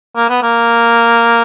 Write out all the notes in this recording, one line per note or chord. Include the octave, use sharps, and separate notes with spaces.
A#3
B3
A#3